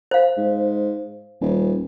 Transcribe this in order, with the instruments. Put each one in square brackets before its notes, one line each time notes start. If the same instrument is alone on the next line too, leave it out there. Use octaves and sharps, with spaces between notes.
[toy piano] C5 F5
[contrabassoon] G#2
D#1